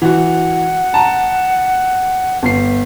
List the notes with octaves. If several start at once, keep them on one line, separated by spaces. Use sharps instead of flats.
E3 F#4 F#5
A5 A#5
G1 C7